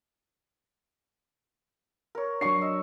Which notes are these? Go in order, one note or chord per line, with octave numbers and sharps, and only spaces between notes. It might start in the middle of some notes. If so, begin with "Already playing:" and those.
A#4 C#5
F#3 D4 C#6 C7
D#5 E6